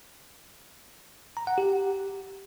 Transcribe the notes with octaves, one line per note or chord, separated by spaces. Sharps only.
A#5
F#5
G4